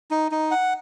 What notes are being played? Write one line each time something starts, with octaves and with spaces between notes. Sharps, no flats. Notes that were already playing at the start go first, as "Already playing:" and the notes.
D#4
D#4
F#5